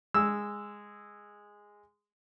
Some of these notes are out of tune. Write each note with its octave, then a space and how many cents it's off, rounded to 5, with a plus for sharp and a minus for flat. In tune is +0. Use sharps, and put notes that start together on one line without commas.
G#3 -10 E6 +0